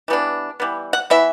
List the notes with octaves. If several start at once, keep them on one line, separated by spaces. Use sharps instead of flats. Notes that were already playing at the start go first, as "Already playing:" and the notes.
E3 G3 B3 D4
E3 G3 B3
F#5
E3 B3 E4 E5